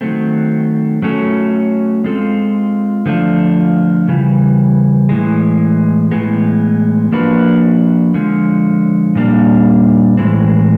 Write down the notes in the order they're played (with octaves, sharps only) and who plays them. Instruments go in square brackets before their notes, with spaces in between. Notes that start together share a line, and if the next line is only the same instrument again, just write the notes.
[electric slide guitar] D#3 F#3 A3 C4
F#3 A3 C#4 F#4 A4
G#3 C4 F4 A4
D3 F3 A3 D4 F4
C#3 E3 G3
A2 E3 G#3
A2 E3 G#3 B3
F3 A#3 D4 F#4 B4
D3 F3 G#3
A#2 G3 A#3 D4
A2 E3 G#3 C4